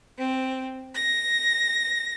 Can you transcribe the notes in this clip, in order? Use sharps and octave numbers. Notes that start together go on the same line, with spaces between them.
C4
A#6